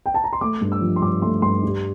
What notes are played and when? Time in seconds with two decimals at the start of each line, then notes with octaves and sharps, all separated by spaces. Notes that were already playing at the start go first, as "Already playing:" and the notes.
0.06 G5
0.14 A5
0.24 A#5
0.33 C6
0.41 A3 D6
0.61 G2
0.72 E6
0.81 F3
0.96 C6
1.02 G2 D6
1.22 A3 C6
1.42 G2 C6
1.63 G3